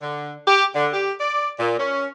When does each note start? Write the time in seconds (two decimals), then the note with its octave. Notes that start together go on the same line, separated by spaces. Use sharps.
0.02 D3
0.48 G4
0.75 D3
0.93 G4
1.20 D5
1.60 A#2
1.80 C#4